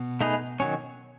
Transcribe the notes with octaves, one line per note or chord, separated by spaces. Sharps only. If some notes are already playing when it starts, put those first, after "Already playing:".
Already playing: B2
A3 D#4 G#4 B4
D#3 F#3 C#4